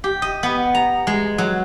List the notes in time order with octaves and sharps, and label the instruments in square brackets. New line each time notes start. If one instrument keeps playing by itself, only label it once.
[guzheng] G4
D#5
B3
A#5
G#3
F#3